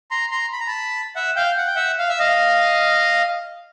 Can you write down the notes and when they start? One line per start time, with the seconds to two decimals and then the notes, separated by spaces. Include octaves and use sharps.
0.11 A#5 C6
0.31 A#5 C6
0.53 B5
0.60 A#5
0.67 A5 B5
1.16 E5 F#5
1.36 F5 G5
1.57 F#5
1.67 G5
1.76 E5 F#5
1.99 F5
2.09 E5
2.19 D#5 F5